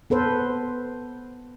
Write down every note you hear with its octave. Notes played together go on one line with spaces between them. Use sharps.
B3 A4 B4 C5